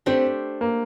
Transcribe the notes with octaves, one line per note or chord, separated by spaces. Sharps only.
A3 C4 D4 G4 C5
A#3